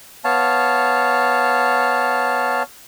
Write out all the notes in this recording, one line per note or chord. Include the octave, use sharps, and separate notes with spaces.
B3 C#5 F5 A5